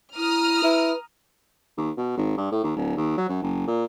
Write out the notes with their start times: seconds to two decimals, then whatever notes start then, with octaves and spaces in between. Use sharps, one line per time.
0.17 E4 A#5 D#6 F6
0.64 E4 B4
1.77 D#2
1.97 B2
2.17 G#1
2.37 G2
2.52 A2
2.64 D#2
2.76 D1
2.97 D#2
3.17 F#3
3.29 F#2
3.42 F#1
3.67 A#2